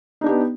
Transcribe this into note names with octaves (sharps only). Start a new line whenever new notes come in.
B3 D4 D#4 G4